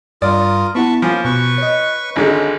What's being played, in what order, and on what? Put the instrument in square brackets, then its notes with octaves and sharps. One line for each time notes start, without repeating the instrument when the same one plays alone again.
[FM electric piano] G2 [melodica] F4 A#4 D#6 [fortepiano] D5
[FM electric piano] B3 E4 F#5 [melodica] A5 B5 C#6
[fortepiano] F3 [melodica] A#3 C#4 [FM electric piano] B5
[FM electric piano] B2 [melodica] B4 C#6
[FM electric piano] C#5 D#5
[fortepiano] G#1 D3 G#3 [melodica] C#4